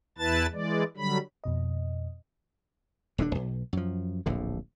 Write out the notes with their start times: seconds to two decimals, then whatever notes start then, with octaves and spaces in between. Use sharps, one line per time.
0.18 E2 E4 B4 A5 A6
0.53 E3 G#3 D5
0.97 D3 F#3 G3 B5
1.44 F2 B2 D#5
3.18 D#1 D3 C#4 D4
3.35 B1
3.73 F#2 F3
4.26 D1 A#1 A2 D3